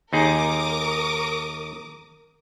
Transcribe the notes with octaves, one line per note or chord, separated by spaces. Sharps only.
D#2 D#4 G#4 A#4 D6 D#6